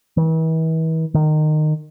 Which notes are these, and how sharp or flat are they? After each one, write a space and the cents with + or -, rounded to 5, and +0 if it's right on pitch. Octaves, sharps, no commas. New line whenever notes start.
E3 -40
D#3 -20